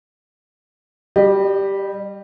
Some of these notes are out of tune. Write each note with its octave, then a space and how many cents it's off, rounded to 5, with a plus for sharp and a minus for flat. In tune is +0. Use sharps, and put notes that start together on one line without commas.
G3 +0 G4 +0 D#5 -45